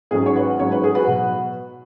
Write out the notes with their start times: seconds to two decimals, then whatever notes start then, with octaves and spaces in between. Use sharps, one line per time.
0.11 G#1 G#2 F#3 C#4 G#4
0.26 C#5
0.35 F#4 B4
0.59 G#1 G#2 F#3 C#4 C#5
0.72 B4
0.84 G#4
0.95 F#4 B4
1.07 B2 F#3